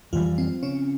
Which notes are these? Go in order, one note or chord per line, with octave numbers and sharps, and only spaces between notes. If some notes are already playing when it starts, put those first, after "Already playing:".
F2 E3 F3 G3 F4
C4
C#3 C#4